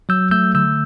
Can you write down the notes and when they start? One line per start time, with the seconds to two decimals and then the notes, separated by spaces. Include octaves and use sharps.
0.09 F#3 E6 G6
0.31 A3 E6 G6
0.55 D3 E6 G6